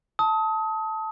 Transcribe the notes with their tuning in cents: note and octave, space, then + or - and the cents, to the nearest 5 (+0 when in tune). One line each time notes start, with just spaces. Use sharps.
A5 +0 D#6 +30